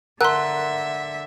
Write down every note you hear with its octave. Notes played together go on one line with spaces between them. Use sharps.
D3 A#4 E5 F#5 A5 A#5 C6 F#6